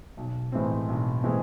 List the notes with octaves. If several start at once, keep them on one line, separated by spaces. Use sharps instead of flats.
B1
A2 E3 G#3 C4
B1
A2 E3 G#3 C4